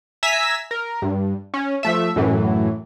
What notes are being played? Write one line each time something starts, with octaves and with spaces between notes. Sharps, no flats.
E5 G#5 A#5 E6 B6
A#4
G2
C#4
F3 A3 E5
F#2 A2 E3 F#3